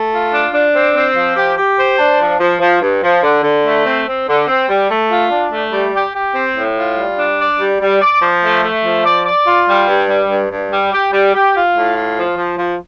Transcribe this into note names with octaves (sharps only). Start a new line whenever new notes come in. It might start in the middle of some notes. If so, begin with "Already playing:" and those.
Already playing: A3
F4
D4
D4
C4
C4
F3
G4
G4
C5
D4
F3
F3
F3
G2
F3
D3
D3
A3
C4
C4
D3
C4
G3
A3
F4
D4
A3
G3
G4
G4
C4
A2
F4
G3
D4
D5
G3
G3
D5
F3
A3
A3
F3
D5
D5
F4
G3
G2
G3
G2
G2
G3
G4
G3
G4
F4
A2
F4
F3
F3
F3